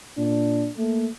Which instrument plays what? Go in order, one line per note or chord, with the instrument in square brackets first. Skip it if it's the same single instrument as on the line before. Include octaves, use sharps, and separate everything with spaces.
[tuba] A#2 [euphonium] D4
[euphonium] A3 [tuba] A#3